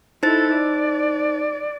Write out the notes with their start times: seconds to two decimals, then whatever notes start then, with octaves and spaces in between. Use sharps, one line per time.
0.23 D#4 E4 A4 C5 A6
0.54 D5